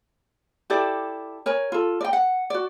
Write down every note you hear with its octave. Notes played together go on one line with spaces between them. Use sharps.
E4 G4 A4 D5
A#4 C#5 G#5
F4 A4
D5 G5
F#5
F#4 D5